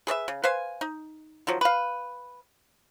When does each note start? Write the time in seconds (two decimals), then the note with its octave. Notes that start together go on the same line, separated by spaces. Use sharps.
0.07 G#4 B4 D5 E5
0.28 C#3
0.44 B4 C5 F5 G#5
0.81 D#4
1.47 D#3 F3 F#3
1.61 B4 F5